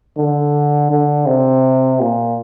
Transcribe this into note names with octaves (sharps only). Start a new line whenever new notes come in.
D3
D3
C3
A#2